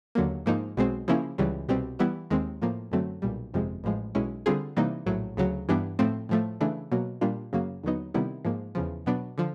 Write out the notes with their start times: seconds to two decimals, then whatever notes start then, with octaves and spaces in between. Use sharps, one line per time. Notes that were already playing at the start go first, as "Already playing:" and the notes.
0.15 D#2 D3 F#3 A#3
0.46 G#2 F3 A#3 D#4
0.77 B1 B2 G#3 C4
1.08 C#3 F3 A#3 C#4 E4
1.38 C#2 C#3 E3 G3
1.69 C2 B2 G3 C4
1.99 E3 G3 B3 E4
2.30 D#2 D#3 G#3 C4
2.62 A2 F3 A#3
2.92 F#2 D3 F#3 A3 C4
3.22 B1 A#2 G3
3.54 G1 F2 C3 F3 G#3
3.84 A1 A2 F3 G#3
4.15 B1 B2 G#3 C#4 E4
4.46 D3 G3 C4 F4 G#4
4.77 C3 E3 G3 A#3 D#4
5.06 A#1 A2 F#3
5.37 D2 C#3 F#3
5.69 G2 E3 G3 B3 D4
5.99 A2 F3 A3 C4
6.29 A2 F3 A3
6.61 C#3 E3 A3 D4
6.91 B2 F#3 A#3
7.21 A#2 G3 A#3 D4 F4
7.53 F#2 C#3 F#3 A#3
7.83 D#2 D3 F#3 B3 D#4
8.14 C3 D#3 G3 B3 E4
8.45 G#2 F3 A#3
8.75 E2 C#3 F3
9.06 B2 F#3 B3 D4
9.38 D3 F3